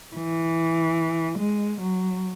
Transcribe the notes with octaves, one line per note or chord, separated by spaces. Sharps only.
E3
G#3
F#3